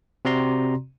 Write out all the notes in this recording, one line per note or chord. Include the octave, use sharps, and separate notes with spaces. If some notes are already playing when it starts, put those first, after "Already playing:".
C3 C4 F#4 D5 A#5 C6